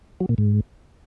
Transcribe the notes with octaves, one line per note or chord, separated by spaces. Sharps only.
F#3
A#2
G#2